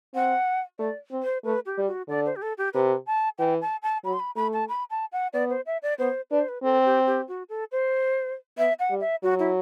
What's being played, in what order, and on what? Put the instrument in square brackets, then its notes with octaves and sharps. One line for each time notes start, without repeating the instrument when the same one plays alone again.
[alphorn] C4 [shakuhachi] F#5
[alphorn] A3 [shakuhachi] D5
[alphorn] C4
[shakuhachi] C5
[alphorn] A3 [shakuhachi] B4
[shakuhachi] G4
[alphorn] G3
[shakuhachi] F#4
[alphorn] D3 [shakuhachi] D5
[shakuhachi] C5
G4
A4
G4
[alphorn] C3 [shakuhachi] B4
[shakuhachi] A5
[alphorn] E3 [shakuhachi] G5
[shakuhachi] A5
A5
[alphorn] F#3 [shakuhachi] B5
[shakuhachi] C6
B5
[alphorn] A3 [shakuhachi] B5
[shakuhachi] A5
B5
A5
F#5
[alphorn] B3 [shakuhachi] D5
[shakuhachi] C5
E5
D5
[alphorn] B3 [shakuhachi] C5
[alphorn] D4 [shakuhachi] B4
[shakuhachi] C5
B4
[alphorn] C4 [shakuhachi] A4
[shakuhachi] G4
G4
F#4
A4
C5
[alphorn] B3 [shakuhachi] E5
[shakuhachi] F#5
[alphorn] G3
[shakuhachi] E5
[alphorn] F#3 [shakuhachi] F#4
[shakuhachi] E4